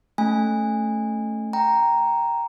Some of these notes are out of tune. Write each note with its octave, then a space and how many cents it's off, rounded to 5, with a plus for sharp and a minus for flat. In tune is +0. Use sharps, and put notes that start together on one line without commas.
A3 +0 C#4 +0 G#5 -25
G5 +0 A#5 +0